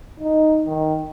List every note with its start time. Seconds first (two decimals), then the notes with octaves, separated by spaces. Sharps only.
0.20 D#4
0.66 D#3